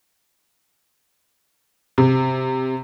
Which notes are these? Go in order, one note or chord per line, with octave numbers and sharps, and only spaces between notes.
C3